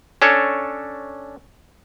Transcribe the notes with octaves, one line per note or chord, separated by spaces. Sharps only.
C#4 D4 A4 C#5